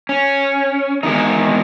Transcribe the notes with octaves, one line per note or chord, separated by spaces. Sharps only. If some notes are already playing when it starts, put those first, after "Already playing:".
C#4
E2 D#3 G#3 D#4